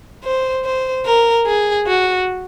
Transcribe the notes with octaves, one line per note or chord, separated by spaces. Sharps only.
C5
C5
A#4
G#4
F#4